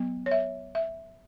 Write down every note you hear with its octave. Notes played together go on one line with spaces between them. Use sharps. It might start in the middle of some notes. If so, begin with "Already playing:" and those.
Already playing: F#3 B3
C#5
E5
E5